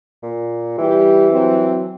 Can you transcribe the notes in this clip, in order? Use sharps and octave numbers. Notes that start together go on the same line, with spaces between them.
A#2
E3 G3 G4
F#3 C4